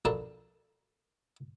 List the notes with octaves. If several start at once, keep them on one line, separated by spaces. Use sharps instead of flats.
A#1 B2 D4 A4 A#4 A5